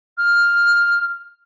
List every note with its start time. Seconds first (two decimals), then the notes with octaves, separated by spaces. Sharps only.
0.17 F6